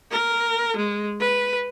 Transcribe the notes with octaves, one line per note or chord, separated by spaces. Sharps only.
A#4
G#3
B4